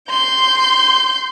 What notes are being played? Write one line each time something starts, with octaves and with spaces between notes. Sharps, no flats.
C6 G6